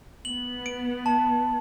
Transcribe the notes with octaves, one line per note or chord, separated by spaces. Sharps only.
B3 F#7
D7
A5